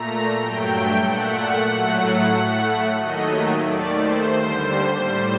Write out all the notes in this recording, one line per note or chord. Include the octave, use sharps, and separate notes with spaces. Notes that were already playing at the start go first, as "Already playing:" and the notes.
Already playing: A#2 A3 A#5
G2 F#3 A3 G5
A#2 A3 F#5
A2 F#3 A3
A2 A3
D#2 D#3 F#3 A3 D#5
D#2 D#3 A3 D5
C5
D#2 D3 G3
A2 G3